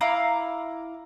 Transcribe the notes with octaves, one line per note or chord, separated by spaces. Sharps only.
E4 F5 A#5 D6